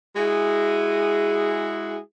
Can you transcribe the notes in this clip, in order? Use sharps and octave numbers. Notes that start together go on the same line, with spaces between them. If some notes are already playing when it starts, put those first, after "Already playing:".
G#3 E4 F#4 G#4